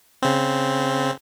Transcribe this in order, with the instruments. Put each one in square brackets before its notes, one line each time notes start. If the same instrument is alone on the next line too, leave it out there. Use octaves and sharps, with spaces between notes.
[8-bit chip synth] C#3 C4